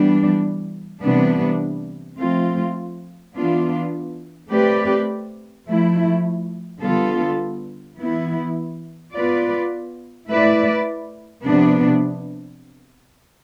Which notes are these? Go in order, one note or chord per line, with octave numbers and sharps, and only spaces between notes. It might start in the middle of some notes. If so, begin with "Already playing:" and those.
Already playing: E3 G3 B3 D4
C3 E3 G3 B3 D4
F3 A3 C4 F4
E3 B3 D4 F4
A3 C4 G4 B4 D5
F3 A3 E4
D3 G3 B3 F4 A4
E3 B3 E4
B3 F4 B4 D5
A3 E4 B4 D5
C3 F3 B3 D4